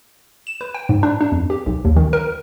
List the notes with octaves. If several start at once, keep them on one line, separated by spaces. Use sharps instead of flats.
E7
B4
G5
G#2
D4
D4
F2
G4
B1
D#2
D#3
A#4